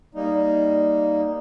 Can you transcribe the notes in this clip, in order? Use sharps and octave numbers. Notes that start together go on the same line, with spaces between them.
G3 A#3 D#4